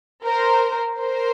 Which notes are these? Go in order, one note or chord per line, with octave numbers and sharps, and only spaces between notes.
A#4 C5
A#4 C5